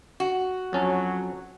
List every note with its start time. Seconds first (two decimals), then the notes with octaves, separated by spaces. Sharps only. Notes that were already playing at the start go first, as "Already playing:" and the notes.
0.20 F#4
0.73 F2 F#3 C#4 A5